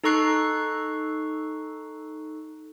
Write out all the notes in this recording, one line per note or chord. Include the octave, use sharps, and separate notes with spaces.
D#4 A4 A#5 C#6 F#6 C7